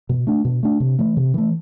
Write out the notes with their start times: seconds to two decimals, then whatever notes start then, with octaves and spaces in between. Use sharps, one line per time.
0.09 B2
0.27 A3 D4
0.45 B2
0.63 A3 D4
0.80 C3
0.99 E3 A3
1.17 C3
1.34 E3 A3